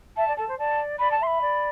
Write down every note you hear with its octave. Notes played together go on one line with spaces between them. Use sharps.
E5 A5
D5
A4 A5
C5
D5 A5
D5 B5
A5
E5 C6
B5
D5